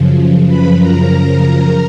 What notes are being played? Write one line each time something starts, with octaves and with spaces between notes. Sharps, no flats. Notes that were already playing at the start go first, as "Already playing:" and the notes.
Already playing: F#2 C#3 F3
B4 B5
A#4 A#5